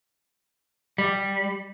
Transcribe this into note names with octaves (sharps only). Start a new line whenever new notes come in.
G3